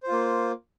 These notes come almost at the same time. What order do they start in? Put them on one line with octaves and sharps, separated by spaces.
C5 F4 A#3